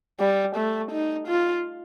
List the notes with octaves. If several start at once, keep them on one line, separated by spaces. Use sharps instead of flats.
G3
A3
D#4
F4